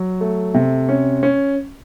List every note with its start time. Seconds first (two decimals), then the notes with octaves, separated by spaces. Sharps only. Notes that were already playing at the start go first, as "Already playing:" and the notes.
Already playing: F#3
0.21 A3
0.54 C3
0.89 C#4
1.23 C#4